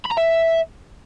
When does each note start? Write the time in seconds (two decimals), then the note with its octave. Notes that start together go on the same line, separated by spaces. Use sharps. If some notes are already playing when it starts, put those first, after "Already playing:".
0.05 B5
0.11 A#5
0.17 E5